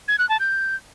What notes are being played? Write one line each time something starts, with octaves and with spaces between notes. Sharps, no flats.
G#6
F#6
A5
G6